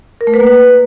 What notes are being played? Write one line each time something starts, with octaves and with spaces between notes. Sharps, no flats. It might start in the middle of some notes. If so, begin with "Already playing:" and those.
A#4
A3
B4
A#3
B4